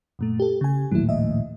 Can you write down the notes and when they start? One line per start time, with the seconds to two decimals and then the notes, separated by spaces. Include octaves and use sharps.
0.19 F#2 A#2 A3
0.40 G4 A4
0.61 C#3 G#5
0.92 A#1 D#2 A2 F#3 E4
1.09 D#5 E5